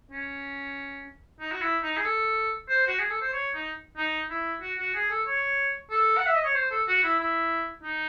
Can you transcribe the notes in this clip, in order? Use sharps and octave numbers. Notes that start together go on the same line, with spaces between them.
C#4
D#4
F#4
E4
D#4
G#4
A4
C5
F#4
G#4
A4
C5
C#5
D#4
D#4
E4
F#4
F#4
G#4
A4
C#5
A4
F#5
E5
D#5
C#5
C5
A4
F#4
E4
E4
D#4